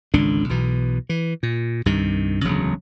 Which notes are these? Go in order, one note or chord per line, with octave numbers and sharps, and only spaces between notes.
G#1 C#2 D3 D4
B1 B2 E3
E3
A#2
C2 G2 C3 D#3
E1 D2 C#3 F#3